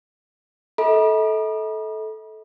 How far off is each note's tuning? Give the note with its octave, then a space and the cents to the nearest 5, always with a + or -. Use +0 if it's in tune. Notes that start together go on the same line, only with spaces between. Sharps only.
A4 -15 D#5 +45 B5 -45